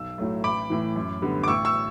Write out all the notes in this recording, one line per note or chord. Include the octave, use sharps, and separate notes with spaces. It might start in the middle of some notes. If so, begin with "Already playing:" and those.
Already playing: B1 E6
A2 F#3 A3
A1 B5 D6
A2 E3
F#2
D3 G3 B3
D6
A1 C#6 E6
C#6 E6